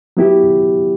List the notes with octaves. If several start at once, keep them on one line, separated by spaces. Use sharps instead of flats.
F#3 B3 E4 G4